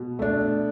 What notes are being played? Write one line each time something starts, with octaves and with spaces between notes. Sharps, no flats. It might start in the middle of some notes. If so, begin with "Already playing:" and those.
Already playing: B2
A3 D4